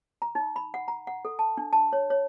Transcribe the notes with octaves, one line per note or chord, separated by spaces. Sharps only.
A#5
D#4
B5
F#5
A#5
F#5
A4
A5
D4
A5
C#5
C#5